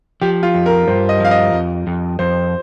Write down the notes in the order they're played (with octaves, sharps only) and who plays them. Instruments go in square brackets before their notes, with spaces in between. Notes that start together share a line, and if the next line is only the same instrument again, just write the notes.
[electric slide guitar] F3 [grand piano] G4
[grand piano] F4
[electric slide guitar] F2
[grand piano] A#4
[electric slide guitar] G2 [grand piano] C5
[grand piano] D#5
[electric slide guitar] F3 [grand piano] F5
[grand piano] D#5
[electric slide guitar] F2
F2
[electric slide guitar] F2 [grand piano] C5